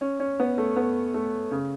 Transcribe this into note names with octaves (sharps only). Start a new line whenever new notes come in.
C#4
C#4
B3
A3
B3
A3
C#3